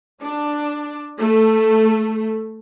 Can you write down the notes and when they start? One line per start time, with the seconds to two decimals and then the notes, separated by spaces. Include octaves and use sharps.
0.21 D4
1.19 A3